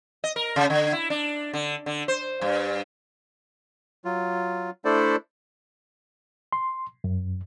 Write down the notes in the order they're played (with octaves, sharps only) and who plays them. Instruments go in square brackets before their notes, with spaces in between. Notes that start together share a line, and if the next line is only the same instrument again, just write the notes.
[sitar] D#5
A#4
C#3
D3
E4
D4
D3
D3
C5
G2
[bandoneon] F#3 F4
A3 D4 E4 A4 C5 D5
[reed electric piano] C6
F#2